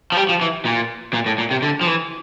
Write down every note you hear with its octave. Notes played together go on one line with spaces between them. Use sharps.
F3
G3
F3
E3
A#2
A#2
A2
A#2
C3
D3
F3
E3